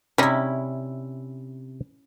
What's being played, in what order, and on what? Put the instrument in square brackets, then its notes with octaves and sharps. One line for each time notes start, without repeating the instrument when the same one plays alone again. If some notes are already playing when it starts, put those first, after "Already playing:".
[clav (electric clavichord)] C3 [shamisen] G3 D#4 [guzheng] C#4 E4